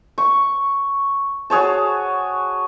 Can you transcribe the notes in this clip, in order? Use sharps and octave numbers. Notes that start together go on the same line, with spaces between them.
C#6
F#4 G#4 C#5 A5